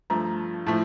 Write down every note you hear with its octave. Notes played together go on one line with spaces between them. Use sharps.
G2 F3 A3 A#5
A2 F3 A3 A5